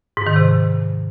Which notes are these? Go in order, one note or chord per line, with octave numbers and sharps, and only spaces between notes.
G#2
D#3
C3